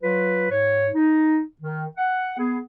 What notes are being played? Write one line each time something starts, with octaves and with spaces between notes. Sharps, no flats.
F#3 F4 B4
G#2 C#5
D#4
D#3
F#5
B3 G#4